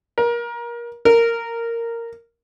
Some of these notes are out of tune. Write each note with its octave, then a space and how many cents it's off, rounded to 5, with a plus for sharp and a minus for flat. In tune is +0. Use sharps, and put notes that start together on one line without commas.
A#4 +25
A#4 -10